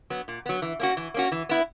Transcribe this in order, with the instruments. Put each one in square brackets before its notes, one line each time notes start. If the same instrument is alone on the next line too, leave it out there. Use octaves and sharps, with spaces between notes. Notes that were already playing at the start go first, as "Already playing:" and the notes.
[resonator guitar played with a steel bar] F#3 B3
A#2
F#3 B3
E3
A#3 C#4 F#4
E3
A#3 C#4 F#4
E3
B3 E4